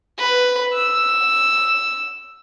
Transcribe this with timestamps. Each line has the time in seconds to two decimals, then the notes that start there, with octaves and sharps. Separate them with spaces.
0.19 B4
0.74 E6